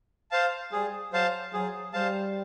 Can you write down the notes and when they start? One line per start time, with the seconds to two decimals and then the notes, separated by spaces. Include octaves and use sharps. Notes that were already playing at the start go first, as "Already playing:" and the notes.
0.31 C5 F5 A5
0.72 G3 G#4
1.12 F#3 C5 F5 A5
1.53 F#3 G#4
1.93 G3 C5 F5 A5